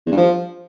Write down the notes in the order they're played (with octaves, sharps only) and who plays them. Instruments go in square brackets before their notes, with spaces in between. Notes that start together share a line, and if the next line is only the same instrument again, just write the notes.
[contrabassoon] E2
G2
F3